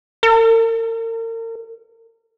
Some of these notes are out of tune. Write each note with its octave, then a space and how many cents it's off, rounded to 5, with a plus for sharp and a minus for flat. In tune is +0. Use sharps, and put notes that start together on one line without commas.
A#4 -40